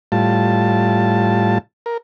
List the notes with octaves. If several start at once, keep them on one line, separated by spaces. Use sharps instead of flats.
A2 G3 F4 A5
A#4